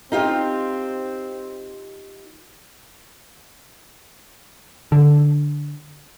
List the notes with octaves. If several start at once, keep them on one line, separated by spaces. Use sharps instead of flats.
C4 D#4 F4 G4
D3